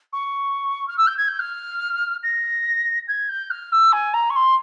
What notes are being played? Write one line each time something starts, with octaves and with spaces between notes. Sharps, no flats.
C#6
F6
E6
G6
G#6
G6
F6
A#6
G#6
G6
F6
E6
G#5
A#5
C#6
C6